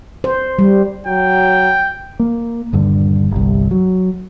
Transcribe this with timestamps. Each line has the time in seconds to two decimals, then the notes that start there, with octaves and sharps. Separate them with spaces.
0.24 C5
0.59 G3
1.07 F#3 G5
2.19 A#3
2.73 D#1 G2 D3
3.31 G1 C2
3.71 F#3